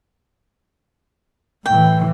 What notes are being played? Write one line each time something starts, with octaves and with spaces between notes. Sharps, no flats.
A2 E3 G5